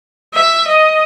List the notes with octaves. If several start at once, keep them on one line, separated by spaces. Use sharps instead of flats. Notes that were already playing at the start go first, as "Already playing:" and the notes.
E5
D#5